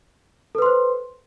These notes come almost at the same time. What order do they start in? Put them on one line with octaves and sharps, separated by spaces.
A4 B4 C6 C5